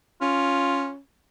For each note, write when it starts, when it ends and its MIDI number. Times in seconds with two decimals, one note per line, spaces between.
0.21 0.98 61
0.21 0.90 65